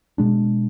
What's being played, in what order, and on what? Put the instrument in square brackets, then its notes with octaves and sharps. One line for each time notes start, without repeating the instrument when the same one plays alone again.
[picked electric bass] B2 G#3 D4